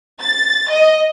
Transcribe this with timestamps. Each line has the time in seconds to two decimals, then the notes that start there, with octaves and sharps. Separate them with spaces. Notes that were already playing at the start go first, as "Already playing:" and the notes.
0.20 A6
0.70 D#5